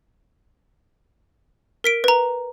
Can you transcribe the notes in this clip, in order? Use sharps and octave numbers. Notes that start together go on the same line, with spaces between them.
A#4 B6 D7
B4 A#5